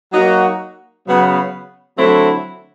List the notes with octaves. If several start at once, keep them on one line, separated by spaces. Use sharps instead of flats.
F#3 A#3 D#4 F#4
C#3 F#3 B3
D3 F#3 A3 C4 E4